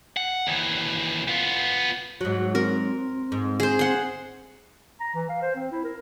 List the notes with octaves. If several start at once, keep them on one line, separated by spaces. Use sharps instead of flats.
F#5
D#2 E3
B3 F4
G#2 F#3 F#4
C4 A#4
G#2
G#4 C5
F#5 C6
A#5
E3
F5
C5
C4
E4
A#4